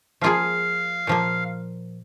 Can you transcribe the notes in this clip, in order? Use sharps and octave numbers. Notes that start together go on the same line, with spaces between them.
F3 A#3 F4 G#4 F5
A#2 F3 A#3